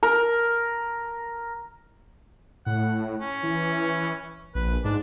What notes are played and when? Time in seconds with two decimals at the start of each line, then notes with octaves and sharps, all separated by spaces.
0.03 A#4
2.66 A2 F#5
3.21 C#4
3.43 E3
4.55 A#1 B4
4.85 G#2 D4